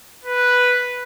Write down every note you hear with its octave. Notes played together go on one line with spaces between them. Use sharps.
B4